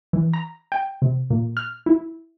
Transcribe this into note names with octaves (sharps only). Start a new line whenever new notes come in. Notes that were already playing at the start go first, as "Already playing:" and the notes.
E3
A#5
G5
C3
A#2
F6
E4